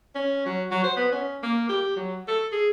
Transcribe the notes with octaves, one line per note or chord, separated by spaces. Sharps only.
C#4
F#3
F#3
C5
B3
C#4
A#3
G4
F#3
A4
G#4